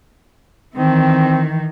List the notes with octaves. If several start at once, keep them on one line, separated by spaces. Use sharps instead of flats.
D#3 E3 C4